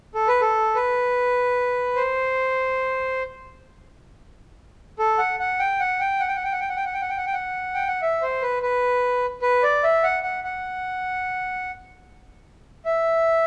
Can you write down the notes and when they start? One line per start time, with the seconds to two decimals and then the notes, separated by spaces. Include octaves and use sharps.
0.15 A4
0.28 B4
0.41 A4
0.75 B4
1.96 C5
4.99 A4
5.18 F#5
5.40 F#5
5.59 G5
5.80 F#5
6.00 G5
6.20 F#5
6.28 G5
6.36 F#5
6.44 G5
6.52 F#5
6.61 G5
6.69 F#5
6.76 G5
6.86 F#5
6.93 G5
7.02 F#5
7.09 G5
7.17 F#5
7.26 G5
7.33 F#5
7.74 G5
7.88 F#5
8.02 E5
8.22 C5
8.42 B4
8.62 B4
9.42 B4
9.63 D5
9.84 E5
10.03 F#5
10.23 F#5
10.44 F#5
12.85 E5